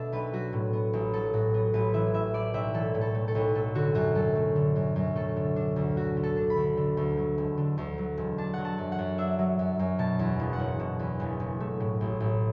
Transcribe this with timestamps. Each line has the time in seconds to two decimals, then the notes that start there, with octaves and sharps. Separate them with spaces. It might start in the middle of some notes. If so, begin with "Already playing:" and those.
Already playing: B2 A3 D4 E5 A5
0.12 B1 B4
0.33 F#3 F#4
0.53 A2
0.73 B3
0.93 A1
1.13 F#3 A4
1.33 A2 F#4
1.54 B3
1.74 A1 B4
1.94 E3 E5
2.14 A2 E5
2.34 A3 D5
2.54 B1 E5
2.74 E3 A4
2.95 A2
3.01 A4
3.15 A3
3.28 A4
3.35 B1
3.55 A3 A4
3.75 D3 F#4
3.95 F#2 F#4
4.15 F#2 A4
4.35 A3
4.56 D3
4.76 F#2
4.96 F#2
5.16 A3 A4
5.36 D3
5.56 D4
5.76 D2
5.96 A3 F#4
6.17 D3
6.23 A4
6.37 D4
6.50 B5
6.57 D2
6.77 D3
6.97 D2
7.17 F#3
7.38 E1
7.58 D3
7.78 D2
7.98 F#3
8.18 E1
8.38 D4 A5
8.54 F#3 F#5
8.65 A5
8.78 F#2
8.92 F#5
8.99 F#2
9.18 D4 E5
9.39 F#3
9.59 F#2
9.79 F#2
9.99 B2 A5
10.19 E2
10.39 F#1
10.53 F#5
10.60 F#1
10.80 B2
11.00 E2
11.20 F#1
11.40 F#1
11.60 A3
11.80 A2
12.01 A1
12.20 A1